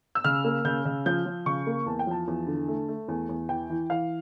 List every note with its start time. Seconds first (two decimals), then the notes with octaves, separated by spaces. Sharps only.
0.15 E6
0.24 C#3 F6
0.44 A#3
0.65 C#3 G6
0.85 C#3
1.06 F3 G6
1.26 F3
1.46 C#3 C#6
1.67 A#3
1.86 E2 A5
1.99 G5
2.07 F3 A5
2.28 E2
2.47 D3
2.68 A3
2.88 A3
3.08 E2
3.29 E2
3.49 E3 G5
3.70 E3
3.90 E3 F5